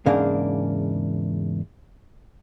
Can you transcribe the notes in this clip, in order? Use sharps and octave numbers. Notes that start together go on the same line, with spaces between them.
E2 G#2 C#3 A#3 D4 F5